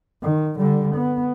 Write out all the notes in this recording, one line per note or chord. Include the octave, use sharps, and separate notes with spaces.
D#3
D3 G3
B3